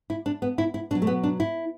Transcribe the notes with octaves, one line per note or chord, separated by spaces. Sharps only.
E4
D4
B3
E4
E4
B2 F#3 D4
A3
B3
D4
E4